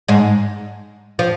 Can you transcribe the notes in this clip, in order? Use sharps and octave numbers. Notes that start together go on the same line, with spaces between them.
G#2 G#3
F3